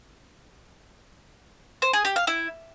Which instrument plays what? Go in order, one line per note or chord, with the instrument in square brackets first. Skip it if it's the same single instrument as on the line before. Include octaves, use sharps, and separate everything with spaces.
[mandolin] C5
G#4
G4
F5
E4